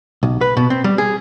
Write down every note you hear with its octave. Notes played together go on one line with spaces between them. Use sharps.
B1
B4
B2
C4
G3
G#4